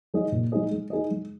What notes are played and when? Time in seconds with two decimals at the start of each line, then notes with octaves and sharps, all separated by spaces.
0.14 G#3 D#4 G#4 D#5
0.32 A#2
0.52 G#3 D#4 G#4 D#5
0.71 G#3
0.90 D#4 G#4 D#5
1.11 G#3